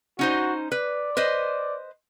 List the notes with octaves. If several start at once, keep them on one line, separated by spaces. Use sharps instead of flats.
C#4 D#4 F#4 C5
B4 D5
B4 C5 D#5